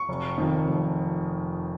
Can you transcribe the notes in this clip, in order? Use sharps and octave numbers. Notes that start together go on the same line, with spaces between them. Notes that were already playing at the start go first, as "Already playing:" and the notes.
Already playing: C#6
F1
F2 D#3
F1